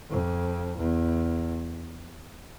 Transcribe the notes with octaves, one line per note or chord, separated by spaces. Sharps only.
F2
E2